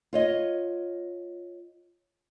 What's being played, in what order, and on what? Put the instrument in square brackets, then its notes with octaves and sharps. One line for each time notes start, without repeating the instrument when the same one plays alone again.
[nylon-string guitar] F4 C#5 D#5